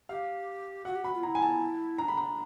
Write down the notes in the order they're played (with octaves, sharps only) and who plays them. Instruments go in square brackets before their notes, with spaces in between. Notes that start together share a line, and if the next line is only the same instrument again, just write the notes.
[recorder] G4 [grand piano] F5
[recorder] F#4 [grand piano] F#5
[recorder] G4
[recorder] F#4 [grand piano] B5
[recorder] F4
[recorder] E4 [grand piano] A#5
[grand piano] G#5
A5
[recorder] D4 [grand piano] A#5
[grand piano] B5
A#5